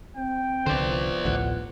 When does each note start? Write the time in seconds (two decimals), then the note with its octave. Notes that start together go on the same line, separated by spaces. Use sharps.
0.16 C4 G5
0.66 C2 D3 F3 B3 C5 D5
1.25 A1 D2 A2 F#5